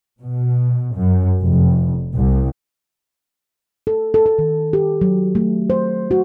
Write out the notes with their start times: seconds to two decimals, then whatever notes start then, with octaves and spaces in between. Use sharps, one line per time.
0.22 B2
0.95 F#2
1.42 F1
2.15 C2
3.87 A4
4.14 A4
4.26 A4
4.39 D#3
4.73 G4
5.01 F#3
5.35 A3
5.70 C5
6.11 F#4